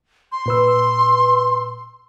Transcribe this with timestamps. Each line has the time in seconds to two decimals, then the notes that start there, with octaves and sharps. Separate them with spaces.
0.32 C6
0.46 A#2 B4 E6